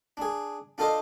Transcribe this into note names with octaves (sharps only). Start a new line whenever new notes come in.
D4 G#4
D4 F4 A4 C5 D#5